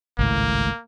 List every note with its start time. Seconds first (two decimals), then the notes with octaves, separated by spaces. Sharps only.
0.19 G#1 C#2 A2 A#3